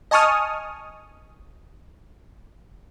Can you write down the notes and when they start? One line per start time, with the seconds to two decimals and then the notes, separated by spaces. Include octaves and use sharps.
0.11 D#5 G#5 A5 C#6 D#6 F6